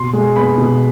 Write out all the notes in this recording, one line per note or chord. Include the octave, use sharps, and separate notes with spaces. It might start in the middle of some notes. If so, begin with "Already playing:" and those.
Already playing: B2 C6
G#3
B3 B5
B2